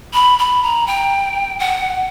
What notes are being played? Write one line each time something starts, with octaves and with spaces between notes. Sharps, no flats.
B5
B5
A#5
G5
F#5